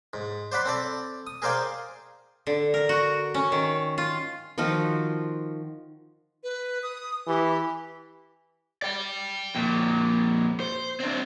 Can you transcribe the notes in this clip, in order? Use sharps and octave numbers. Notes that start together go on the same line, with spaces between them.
G#2
C5 D5 F#5 B5
C4 A4 D5
D#6
G#4 A#4 C5 D5 F5 G5
D3
A#4
F#4
C#4
D#3
F4
D#3 F3 F4 F#4
B4
D#6
E3 G4
D5 G5
F2 A#2
C5
C4 D4